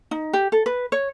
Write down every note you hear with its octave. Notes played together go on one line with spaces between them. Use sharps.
D#4
G4
A4
B4
C#5